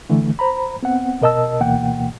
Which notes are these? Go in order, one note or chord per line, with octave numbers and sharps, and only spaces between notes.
D3 E3 A3
C5 A#5 B5
B3 C4 F#5
B2 A#4 D#5 A5 E6
D2 B2 E3 A#3 F#5 G5